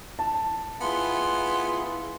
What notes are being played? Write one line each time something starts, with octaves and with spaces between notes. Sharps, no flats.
A5
B3 E4 F4 G#4 C6